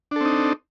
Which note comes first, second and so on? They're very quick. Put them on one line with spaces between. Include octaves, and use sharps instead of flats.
D4 A4 C4 D#4